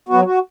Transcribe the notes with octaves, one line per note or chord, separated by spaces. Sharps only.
F#3 B3 F#4
F#4